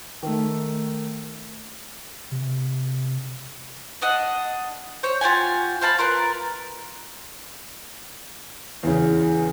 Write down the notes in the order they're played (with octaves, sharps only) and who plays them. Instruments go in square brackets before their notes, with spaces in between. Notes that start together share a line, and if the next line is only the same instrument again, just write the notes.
[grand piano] D#3 A3
[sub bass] C3
[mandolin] D4 D#5 F#5
C5 C#5
F4 G4 F#5 G#5
C5 F5 A5 B5
F4 A#4 B4
[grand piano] E2 C#3